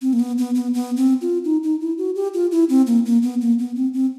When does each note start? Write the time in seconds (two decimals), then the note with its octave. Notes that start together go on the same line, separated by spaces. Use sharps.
0.02 C4
0.13 A#3
0.20 B3
0.38 B3
0.55 B3
0.74 B3
0.97 C4
1.21 F4
1.45 D#4
1.63 D#4
1.81 E4
1.98 F#4
2.16 G4
2.34 F4
2.52 E4
2.69 C4
2.87 A#3
3.06 A#3
3.23 B3
3.41 A#3
3.59 B3
3.76 C4
3.94 C4